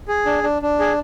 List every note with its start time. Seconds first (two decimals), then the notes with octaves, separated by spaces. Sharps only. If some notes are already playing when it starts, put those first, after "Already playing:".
0.08 G#4
0.26 D4
0.43 D4
0.62 D4
0.80 G#4